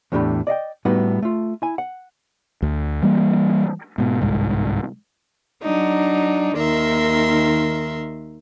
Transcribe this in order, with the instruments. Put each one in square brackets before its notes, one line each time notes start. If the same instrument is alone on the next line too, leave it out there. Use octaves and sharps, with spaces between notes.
[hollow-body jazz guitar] E2 A2 A3 D4 G4 B5
D5 D#5 F5 G5
A2 G3 B3 D#4 F#4 F#5
A3 F4
E4 G#5
F#5
[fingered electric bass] D2
E3 G3 A#3
G#2 B2
G1 C2 G#2
[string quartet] F#3 D4 D#4
D#2 D#3 A#4 E5 C6